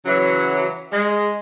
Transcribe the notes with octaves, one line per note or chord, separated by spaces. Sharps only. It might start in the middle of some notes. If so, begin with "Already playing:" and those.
C#3 E3 F#3
G#3